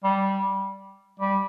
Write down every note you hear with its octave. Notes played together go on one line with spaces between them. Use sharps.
G3
G3